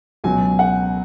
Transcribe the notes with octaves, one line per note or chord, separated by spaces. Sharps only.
C#2 B2 F#3 G#5
F#5